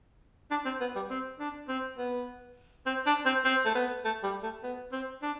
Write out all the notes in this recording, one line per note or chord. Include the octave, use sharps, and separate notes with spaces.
D4
C4
B3
G3
C4
D4
C4
B3
C4
D4
C4
C4
A3
B3
A3
G3
A3
B3
C4
D4